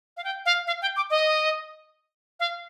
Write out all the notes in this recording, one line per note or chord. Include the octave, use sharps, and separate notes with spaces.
F5
G5
F5
F5
G5
D6
D#5
F5